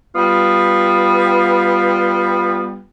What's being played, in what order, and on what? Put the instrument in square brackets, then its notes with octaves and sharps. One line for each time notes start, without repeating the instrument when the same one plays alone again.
[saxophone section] G3 B3 F4